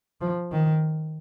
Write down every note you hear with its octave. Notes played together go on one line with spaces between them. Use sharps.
F3
D#3